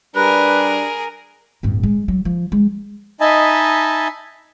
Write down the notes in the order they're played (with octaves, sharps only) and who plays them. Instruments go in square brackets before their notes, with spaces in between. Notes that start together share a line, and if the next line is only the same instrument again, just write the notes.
[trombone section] G3 D4 [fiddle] G#4 A#4 [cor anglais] B4
[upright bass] D1 G2
G#3
F#3
F3
G#3
[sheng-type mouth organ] D#4 D#5 E5 G#5 A5 B5